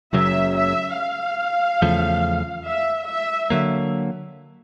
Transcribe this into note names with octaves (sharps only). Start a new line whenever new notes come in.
F#1 F#2 C#3 F#3 E5
E5
F5
E2 C#3 F3 A3
E5
E5
D3 F#3 A#3